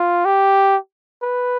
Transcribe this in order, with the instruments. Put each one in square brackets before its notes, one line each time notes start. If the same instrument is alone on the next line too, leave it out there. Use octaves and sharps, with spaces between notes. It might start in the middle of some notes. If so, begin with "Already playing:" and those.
Already playing: [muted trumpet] F4
G4
B4